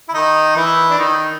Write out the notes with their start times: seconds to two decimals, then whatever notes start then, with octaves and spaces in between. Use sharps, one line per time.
0.09 E4
0.13 D#3 D#4
0.56 E3 E4
0.90 D4
0.98 D#3 D#4